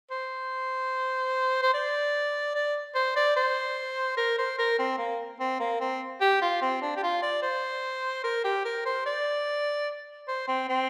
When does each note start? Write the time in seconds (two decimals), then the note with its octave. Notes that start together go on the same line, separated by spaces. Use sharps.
0.11 C5
1.62 C5
1.74 D5
2.55 D5
2.95 C5
3.16 D5
3.36 C5
4.17 A#4
4.38 C5
4.58 A#4
4.79 C4
4.98 A#3
5.40 C4
5.60 A#3
5.80 C4
6.21 G4
6.42 F4
6.62 C4
6.82 D4
6.97 G4
7.03 F4
7.22 D5
7.42 C5
8.24 A#4
8.44 G4
8.65 A#4
8.86 C5
9.06 D5
10.28 C5
10.48 C4
10.68 C4